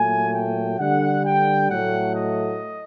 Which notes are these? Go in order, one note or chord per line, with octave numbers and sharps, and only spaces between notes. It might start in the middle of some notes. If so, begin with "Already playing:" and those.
Already playing: A#2 F#3 A3 G#5
G5
D3 G3 F#5
G5
A2 F#3 A3 F#5
D#5